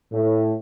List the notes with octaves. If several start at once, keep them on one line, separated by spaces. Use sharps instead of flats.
A2